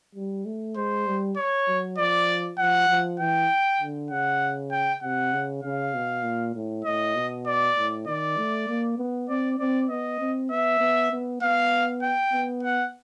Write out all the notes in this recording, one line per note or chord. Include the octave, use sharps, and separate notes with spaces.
G3
A3
G#3 C5
G3
C#5
F#3
F3 D5
F3 F#5
F3
E3 G5
D3
C#3 F#5
G5
C3 F#5
C#3
C#3 F5
B2
A#2
A2
A2 D#5
B2
D5
A2
D#3 D5
A3
A#3
B3
C4 D5
C4 D5
B3 D#5
C4
B3 E5
B3
B3
B3 F5
G5
B3
F#5